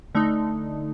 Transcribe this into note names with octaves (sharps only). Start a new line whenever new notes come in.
D3 A3 D#4